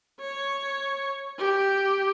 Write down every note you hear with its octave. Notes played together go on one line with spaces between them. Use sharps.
C#5
G4